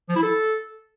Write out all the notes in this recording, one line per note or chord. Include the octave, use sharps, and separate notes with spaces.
F3
E4
A4